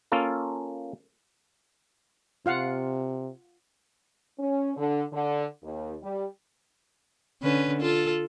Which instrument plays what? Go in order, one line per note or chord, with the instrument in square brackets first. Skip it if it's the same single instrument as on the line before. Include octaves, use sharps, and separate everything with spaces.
[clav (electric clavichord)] A#3 C#4 F4 A4
[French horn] C3 [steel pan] F4 F5 F#5
[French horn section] C#4
D3
D3
D#2
G3
[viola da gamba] D3 C#4 B4
F4 A4